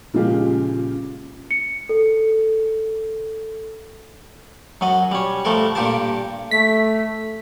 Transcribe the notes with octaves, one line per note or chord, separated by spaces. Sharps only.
A#2 C#3 F3 G#3 F4 G4
C#7
A4
F#2 F#3 D#5
G3 C#4
F3 G3 A3 A4 A#4
G2 A#2 G4 A#4 A5
A3 B6